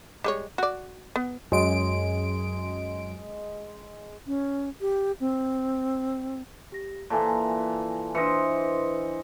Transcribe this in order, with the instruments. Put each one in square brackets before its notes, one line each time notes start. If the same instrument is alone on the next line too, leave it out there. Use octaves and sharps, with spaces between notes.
[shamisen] G3 G#3 C#5
F#4 D5
B3
[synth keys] F#2 D7 [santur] G#3
[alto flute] C#4
G4
C4
[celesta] G4 A#6
[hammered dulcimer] A#2 E3 [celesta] A4 G#5 A5
[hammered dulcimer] E3 C5 D#5 [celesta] D4 B4 C#7